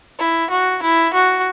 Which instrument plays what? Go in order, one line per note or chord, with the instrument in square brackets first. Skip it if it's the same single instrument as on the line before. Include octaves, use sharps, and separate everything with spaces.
[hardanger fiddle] E4
F#4
E4
F#4